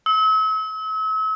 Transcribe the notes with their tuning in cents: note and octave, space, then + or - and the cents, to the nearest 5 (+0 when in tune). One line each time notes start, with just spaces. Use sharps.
E6 -40